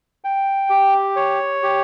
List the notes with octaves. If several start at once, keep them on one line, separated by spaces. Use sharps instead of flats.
G5
G4
C#5
G4